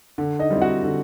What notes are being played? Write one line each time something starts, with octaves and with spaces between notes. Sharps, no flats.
D3
D#4 D#5
G3 C4 E4
F#4 F#5
D3